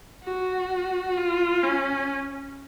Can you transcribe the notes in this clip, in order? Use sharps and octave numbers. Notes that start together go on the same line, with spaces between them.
F#4
F4
C#4